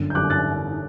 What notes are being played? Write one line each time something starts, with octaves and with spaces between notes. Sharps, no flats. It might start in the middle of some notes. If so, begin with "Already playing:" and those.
Already playing: G1 F#2 D3
G6
G1 F#2 D3 D6 F#6
F#6 A6